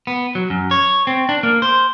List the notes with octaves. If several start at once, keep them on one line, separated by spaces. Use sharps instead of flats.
B3
F#3
F#2
C#5
C4
D4
A#3
C5